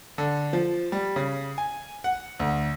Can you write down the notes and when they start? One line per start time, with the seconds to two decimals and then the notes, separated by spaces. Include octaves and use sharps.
0.18 D3
0.53 F3
0.92 G3
1.16 C#3
1.58 G#5
2.04 F#5
2.40 D2